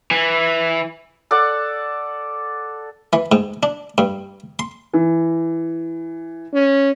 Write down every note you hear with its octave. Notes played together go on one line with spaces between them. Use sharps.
E3
A4 D5 F#5
E3
G#2
D4
G2
C6
E3
C#4